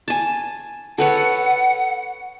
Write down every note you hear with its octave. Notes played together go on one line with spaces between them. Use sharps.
G#5 A5
A4 B4 C#5 F#5